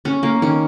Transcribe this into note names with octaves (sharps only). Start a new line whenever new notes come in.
C#4
A#3
D#3 C#4